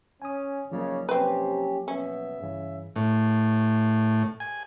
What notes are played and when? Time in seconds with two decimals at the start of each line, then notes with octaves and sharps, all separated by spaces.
0.22 C#4 G#5 D#6
0.71 C#3 F3 F#3 A#3 D#4 C#5 D5
1.09 C3 C4 C#4 G4 B4
1.88 B2 C#4 E5
2.40 G2 C#3 E3
2.96 A2
4.40 G#5